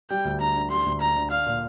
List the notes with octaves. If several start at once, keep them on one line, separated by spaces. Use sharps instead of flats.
G3 G5
D2
D4 A#5
D3
G3 C6
D2
D4 A#5
D3
D4 F5
A#2